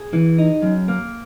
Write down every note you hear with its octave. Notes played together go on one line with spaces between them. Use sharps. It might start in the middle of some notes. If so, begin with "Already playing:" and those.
Already playing: G#4
E3
D#4
F#2
A#3